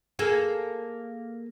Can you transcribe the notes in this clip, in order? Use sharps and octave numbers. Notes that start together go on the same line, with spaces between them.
A#3 G#4 A4